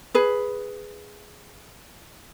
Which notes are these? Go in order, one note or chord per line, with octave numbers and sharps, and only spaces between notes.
G#4 B4